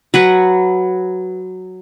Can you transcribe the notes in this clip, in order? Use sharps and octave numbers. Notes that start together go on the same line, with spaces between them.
F#3 B4 F#5